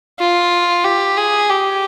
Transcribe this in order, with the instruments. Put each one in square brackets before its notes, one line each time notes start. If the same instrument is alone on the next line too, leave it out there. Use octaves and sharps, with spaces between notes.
[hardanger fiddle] F4
G4
G#4
G4